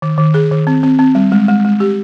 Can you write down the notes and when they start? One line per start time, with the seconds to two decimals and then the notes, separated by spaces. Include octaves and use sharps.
0.02 D#3
0.18 D#3
0.34 G#4
0.51 D#3
0.67 C4
0.83 C4
0.99 C4
1.15 G3
1.32 G#3
1.48 G#3
1.65 G#3
1.80 G4